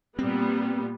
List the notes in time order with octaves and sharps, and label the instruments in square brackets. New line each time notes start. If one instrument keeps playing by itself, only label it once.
[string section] A#2 G3 B3 [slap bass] C4